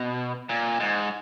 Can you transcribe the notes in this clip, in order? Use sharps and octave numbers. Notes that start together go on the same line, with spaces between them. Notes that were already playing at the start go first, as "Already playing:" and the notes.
Already playing: B2
A#2
G#2